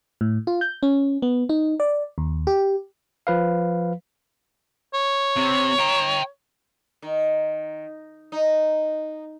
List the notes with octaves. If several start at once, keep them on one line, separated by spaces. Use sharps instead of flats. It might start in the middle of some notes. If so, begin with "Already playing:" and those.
A2
F4
G6
C#4
B3
D#4
D5
D#2
G4
F3 B4 F5
C#5
C3
G5 A#5
D#3
D#4